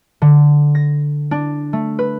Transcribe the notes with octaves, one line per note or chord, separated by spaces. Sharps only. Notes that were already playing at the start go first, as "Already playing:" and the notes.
D3
A#6
D4
A3
B4